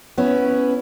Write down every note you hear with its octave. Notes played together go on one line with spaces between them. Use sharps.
B3 C#4 E4